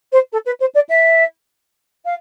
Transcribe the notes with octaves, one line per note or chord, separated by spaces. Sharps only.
C5
A4
B4
C5
D5
E5
F5